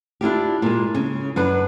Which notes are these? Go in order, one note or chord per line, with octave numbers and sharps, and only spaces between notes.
D4 E4 F4 G4
A#2 G#3
C#3
F#2 D4 B4